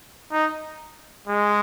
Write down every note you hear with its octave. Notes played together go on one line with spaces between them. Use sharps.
D#4
G#3